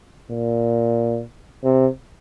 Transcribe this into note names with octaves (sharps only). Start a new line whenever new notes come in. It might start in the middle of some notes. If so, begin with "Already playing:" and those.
A#2
C3